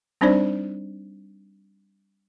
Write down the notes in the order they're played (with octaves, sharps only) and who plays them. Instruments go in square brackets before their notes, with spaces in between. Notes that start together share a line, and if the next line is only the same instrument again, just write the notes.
[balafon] G3 C4 D4 D#4 C5 D5